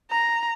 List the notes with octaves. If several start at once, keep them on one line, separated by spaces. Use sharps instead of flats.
A#5